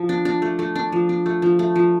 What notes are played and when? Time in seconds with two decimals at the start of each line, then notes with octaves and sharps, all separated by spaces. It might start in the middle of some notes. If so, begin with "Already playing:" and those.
Already playing: F3
0.09 D4
0.25 D4
0.42 A3
0.59 A3
0.75 D4
0.92 F3
1.09 D4
1.26 A3
1.42 F3
1.59 A3
1.76 F3